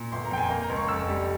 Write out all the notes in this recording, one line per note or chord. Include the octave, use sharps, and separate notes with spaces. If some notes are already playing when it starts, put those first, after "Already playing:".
Already playing: A#2
G1 C6
A#5
F2 G5
G#5
A#3
A#5
C#2
C#6
F1 E6
G3